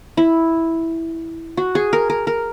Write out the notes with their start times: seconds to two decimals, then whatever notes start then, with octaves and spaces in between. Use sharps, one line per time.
0.17 E4
1.57 F#4
1.75 G#4
1.93 A#4
2.10 A#4
2.27 A#4